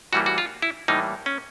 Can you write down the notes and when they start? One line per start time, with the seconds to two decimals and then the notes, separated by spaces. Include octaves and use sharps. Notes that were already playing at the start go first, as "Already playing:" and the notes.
0.12 A2 E3 G3 A#3 F#4
0.26 F#4
0.38 F4
0.62 E4
0.88 A2 E3 G3 A#3 D#4
1.26 C#4